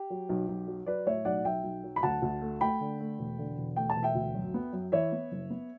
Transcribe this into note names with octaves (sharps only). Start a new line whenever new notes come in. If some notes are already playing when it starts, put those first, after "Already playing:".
Already playing: G4
F#3
B1
B1
F#3
F#3 B4 D5
A2 C#5 E5
B1 D5 F#5
B1 E5 G5
B1
F#3
B5
D2 F#5 A5
D2
A3
A3 G5 B5
D3
A3
E1
D3
E1
A3 G5
A5
E1
E5 G5
D2
F#2
B3
F#2
E3 C#5 E5
B3
F#1
B3